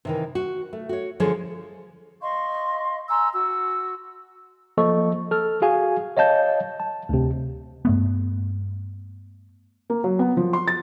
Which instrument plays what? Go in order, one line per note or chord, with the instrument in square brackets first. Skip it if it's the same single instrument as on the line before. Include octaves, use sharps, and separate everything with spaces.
[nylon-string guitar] C3 D#3 E3
F#4
A3
F#4 C#5
D3 F3 G#3 G#4 A4 C#5
[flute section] D#5 F5 C6 C#6
G#5 A#5 C6 E6
F#4 E6
[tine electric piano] F3 A#3 A4 D#5 C#6
A4 F6
F#4 G#4 F5 G#5
C#5 D#5 F5 A5 G6
A5
D2 C3
[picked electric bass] G2 A3 B3
[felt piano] A#3
F#3
B3
F3
C6
A6